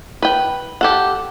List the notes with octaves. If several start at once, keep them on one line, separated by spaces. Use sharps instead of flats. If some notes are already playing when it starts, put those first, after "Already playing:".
B4 G5
G4 A4 F#5